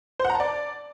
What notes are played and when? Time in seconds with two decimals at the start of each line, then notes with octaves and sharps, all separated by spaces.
0.19 C5
0.25 F#5
0.30 A#5
0.35 A5
0.40 D5